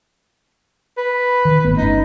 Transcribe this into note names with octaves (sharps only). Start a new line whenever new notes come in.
B4
D#3
G#1 A3 B3
G1 C#4 D#4